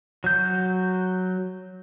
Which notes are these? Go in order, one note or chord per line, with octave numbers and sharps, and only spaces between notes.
F#3 G6